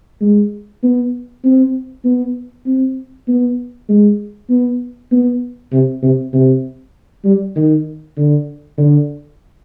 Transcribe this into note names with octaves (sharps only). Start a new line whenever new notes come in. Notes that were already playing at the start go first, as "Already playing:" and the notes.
G#3
B3
C4
B3
C4
B3
G#3
B3
B3
C3
C3
C3
G3
D#3
D3
D3